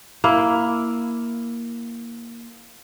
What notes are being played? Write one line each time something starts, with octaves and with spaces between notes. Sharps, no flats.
A#3 E4